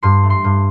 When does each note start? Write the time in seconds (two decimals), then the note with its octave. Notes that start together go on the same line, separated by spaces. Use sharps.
0.03 G2 C6
0.23 A3
0.30 C6
0.44 G2